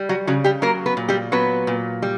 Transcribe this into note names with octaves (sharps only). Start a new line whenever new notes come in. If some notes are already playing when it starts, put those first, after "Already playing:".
Already playing: G3
F#3 F#4
C#3 F#3 F#4
G3 G4
F#3 A#3 A#4
B3 B4
A#2
G3 G4
F#3 B3 B4
A#2
G3